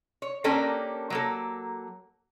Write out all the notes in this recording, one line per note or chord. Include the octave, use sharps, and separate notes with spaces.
C#5
A#3 C#4 D4 G4 A4 A#4
F#3 A#3 A4